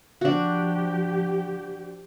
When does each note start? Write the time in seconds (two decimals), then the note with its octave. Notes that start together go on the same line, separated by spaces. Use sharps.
0.21 F3 D4 F#4 G4